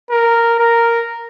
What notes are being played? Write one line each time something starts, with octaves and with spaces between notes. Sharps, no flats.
A#4
A#4